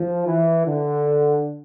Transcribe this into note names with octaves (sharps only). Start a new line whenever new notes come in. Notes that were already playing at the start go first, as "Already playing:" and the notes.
Already playing: F3
E3
D3